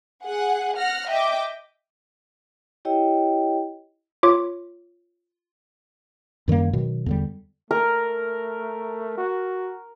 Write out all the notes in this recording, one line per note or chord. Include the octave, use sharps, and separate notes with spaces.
G#4 F#5
F#5 F6 A#6
D#5 E5 G5 D6
E4 G4 C#5 D#5 G5
F4 C#5 D6
F#2 D#3 G3 A#3
B2 D#3 F#3
E2 D3 G3
A3 A#4
F#4